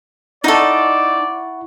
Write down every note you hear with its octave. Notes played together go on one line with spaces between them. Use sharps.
D#4 E4 A4 D5 F#5 C#6